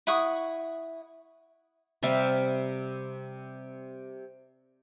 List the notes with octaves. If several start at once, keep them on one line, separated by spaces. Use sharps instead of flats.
E4 F#5 C#6 D#6
C3 G3 E5 F5